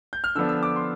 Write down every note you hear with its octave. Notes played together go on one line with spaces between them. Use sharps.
G6
F6
D3 F3 B3 D4 E6
E6
D6
C6